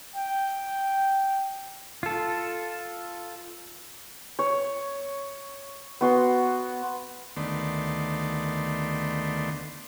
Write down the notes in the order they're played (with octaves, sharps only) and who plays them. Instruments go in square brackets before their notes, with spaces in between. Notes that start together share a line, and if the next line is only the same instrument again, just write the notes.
[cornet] G5
[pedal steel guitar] F4 A4
[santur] C#5
B3 F#4 C6
[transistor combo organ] D2 D#3 A3 B3 D5 C6